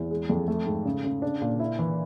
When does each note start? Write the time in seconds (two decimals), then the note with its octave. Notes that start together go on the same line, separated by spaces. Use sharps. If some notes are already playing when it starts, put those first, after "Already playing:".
Already playing: E2
0.11 G#3
0.30 F2
0.48 A3
0.66 G#2
0.85 C#3
1.04 C#3
1.22 D4
1.41 A#2
1.59 E4
1.79 E3